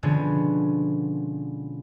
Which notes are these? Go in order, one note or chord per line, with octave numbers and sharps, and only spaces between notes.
B2 D3 F3 G#3 B3 C#4